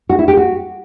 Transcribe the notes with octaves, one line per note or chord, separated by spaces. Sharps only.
F#4
E4
G4
F#4